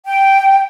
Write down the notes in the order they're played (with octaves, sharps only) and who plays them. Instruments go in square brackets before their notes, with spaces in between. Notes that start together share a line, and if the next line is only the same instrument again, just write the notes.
[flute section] G5